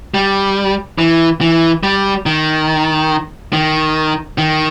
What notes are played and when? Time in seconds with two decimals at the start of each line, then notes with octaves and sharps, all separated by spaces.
0.14 G3
0.98 E3
1.41 E3
1.83 G3
2.26 D#3
3.53 D#3
4.38 D#3